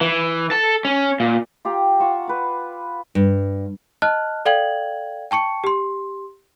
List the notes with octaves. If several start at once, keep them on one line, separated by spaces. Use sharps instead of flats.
E3
A4 A5
C#4
A#2
F4 G4 G5 A#5
F4 F#5 C#6 E6
B4 D6
G2
D#5 A5 F6 F#6
A4 D5 F5 G5 G#6 F#7
G5 A5 C#6 C#7
G4 C6